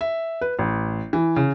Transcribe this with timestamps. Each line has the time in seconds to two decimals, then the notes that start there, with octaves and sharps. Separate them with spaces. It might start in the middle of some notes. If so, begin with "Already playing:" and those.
0.01 E5
0.41 B4
0.59 A1
1.13 E3
1.36 C#3